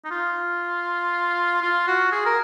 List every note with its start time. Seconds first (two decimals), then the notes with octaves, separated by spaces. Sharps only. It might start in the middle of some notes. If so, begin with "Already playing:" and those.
0.05 D#4
0.11 F4
1.62 F4
1.87 F#4
2.12 G#4
2.26 A#4